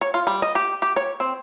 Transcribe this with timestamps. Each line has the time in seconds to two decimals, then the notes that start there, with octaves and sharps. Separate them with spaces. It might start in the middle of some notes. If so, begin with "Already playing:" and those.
0.01 C#5
0.14 F4
0.27 G3
0.42 D#5
0.55 G4
0.82 G4
0.96 C#5
1.20 C4